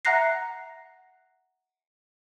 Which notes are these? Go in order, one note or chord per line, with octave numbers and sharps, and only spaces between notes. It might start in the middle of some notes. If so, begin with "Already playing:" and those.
E5 F#5 A#5 F#6 A#6 C7